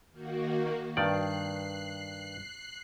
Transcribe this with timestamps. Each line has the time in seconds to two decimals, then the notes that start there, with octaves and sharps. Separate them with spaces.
0.11 D#3 A#3 F#4
0.97 G2 D#3 D5 F#6 C7